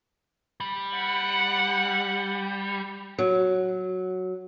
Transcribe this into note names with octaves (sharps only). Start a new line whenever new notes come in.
G3
F#5
F#3